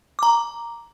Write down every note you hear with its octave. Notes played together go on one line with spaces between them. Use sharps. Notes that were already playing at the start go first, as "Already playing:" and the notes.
A#5 D6